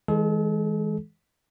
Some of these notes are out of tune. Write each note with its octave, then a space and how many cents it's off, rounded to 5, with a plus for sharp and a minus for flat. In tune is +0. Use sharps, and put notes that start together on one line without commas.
E3 -35 G#3 +0 A4 -40